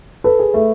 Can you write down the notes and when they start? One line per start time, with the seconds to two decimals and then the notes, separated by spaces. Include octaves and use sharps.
0.24 A4 B4
0.39 G#4
0.54 A3